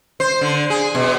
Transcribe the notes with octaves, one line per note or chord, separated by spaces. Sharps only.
C5
D3
G#4
B2